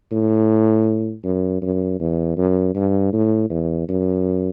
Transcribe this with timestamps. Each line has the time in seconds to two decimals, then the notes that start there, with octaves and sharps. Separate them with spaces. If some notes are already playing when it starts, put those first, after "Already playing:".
0.12 A2
1.24 F#2
1.62 F#2
2.00 E2
2.37 F#2
2.75 G2
3.13 A2
3.50 E2
3.88 F#2